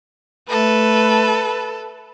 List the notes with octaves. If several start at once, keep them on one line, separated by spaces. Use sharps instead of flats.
A3 A4 B4